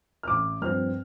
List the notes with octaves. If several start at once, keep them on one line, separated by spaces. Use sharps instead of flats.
F6
A1 D6
G2 F3 C4 F6